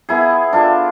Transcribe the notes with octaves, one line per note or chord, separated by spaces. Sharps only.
B3 E4 G#4
D4 F4 A4